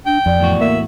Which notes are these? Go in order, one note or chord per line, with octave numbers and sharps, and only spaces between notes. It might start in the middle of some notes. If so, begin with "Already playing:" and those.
D4 G5
F2 D5
E2 A2 F#4
A#3 E5